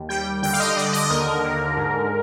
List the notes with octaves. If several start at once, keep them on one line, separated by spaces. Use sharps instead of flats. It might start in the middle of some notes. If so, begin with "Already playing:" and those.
Already playing: D#2
G3 G5
D3 G5
F5
D#5
D3 D5
D#5
D#2 A#4
D3
G#2